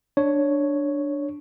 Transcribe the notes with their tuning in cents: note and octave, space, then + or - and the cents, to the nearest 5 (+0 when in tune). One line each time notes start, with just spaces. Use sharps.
D4 +0 C#5 +0